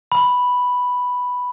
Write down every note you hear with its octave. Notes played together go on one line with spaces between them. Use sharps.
B5